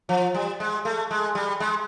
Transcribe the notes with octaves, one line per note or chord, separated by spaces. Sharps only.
F3
G3
G#3
A3
G#3
G3
G#3